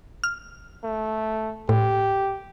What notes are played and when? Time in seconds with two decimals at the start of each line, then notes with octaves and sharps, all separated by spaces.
0.24 F6
0.84 A3
1.69 A2 G4